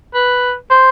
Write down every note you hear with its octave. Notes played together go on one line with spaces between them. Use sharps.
B4
C5